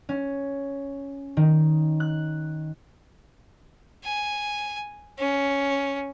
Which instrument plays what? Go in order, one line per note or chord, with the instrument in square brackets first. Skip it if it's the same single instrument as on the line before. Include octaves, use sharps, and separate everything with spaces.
[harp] C#4
D#3
F#6
[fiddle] G#5
C#4